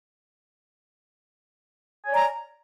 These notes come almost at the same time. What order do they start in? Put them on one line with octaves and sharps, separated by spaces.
G#5 C#5 D5 A#5